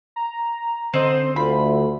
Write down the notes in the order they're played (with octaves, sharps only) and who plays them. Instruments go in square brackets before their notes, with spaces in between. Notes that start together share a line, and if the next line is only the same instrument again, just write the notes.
[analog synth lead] A#5
[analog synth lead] D3 [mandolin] C4 D#5 [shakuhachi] C5
[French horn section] D2 [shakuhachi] F4 [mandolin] B5